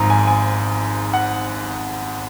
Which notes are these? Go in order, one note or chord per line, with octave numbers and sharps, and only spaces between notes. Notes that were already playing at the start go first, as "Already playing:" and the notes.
Already playing: G#1 G#2 F3 A#5
G#5
G#5
F#5